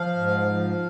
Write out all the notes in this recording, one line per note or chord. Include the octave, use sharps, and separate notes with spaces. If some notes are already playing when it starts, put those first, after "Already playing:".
Already playing: F3 F5
G#2
F3